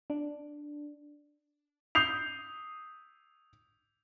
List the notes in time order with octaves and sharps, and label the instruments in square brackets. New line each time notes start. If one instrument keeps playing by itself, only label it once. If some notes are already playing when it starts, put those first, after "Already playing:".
[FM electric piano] D4
[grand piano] D#6 G6 C7 F7